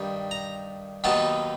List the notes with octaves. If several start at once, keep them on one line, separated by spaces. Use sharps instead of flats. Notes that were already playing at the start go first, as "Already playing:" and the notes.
Already playing: G2 D#3 G3
A#5
D#2 D#3 F#3 B3 D#4 A5